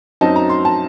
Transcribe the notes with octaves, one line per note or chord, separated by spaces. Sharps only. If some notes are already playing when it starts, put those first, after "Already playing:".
F#2 F#3 C4 D#4 A5
A#5
C6
A5